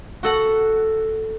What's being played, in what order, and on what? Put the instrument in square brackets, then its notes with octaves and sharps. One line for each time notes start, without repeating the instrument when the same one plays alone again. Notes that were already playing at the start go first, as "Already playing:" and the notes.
[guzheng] F#4 A4 F#5